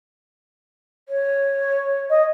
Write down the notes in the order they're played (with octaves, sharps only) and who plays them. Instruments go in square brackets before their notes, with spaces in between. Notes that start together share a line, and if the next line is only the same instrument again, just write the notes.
[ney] C#5
[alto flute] D#5